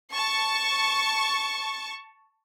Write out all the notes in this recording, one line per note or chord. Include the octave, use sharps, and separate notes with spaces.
A5 C#6